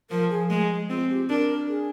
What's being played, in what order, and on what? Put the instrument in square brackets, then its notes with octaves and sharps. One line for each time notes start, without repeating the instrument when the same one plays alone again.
[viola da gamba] F3 [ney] A#4
[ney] G#4
[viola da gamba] G#3 [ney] G#4
[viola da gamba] C4 [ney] F4
[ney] G4
[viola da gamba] D4 [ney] A#4
[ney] G#4